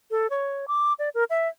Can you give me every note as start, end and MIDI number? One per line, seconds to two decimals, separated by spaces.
0.11 0.27 69
0.30 0.66 73
0.68 0.93 86
0.99 1.09 74
1.15 1.24 70
1.30 1.48 76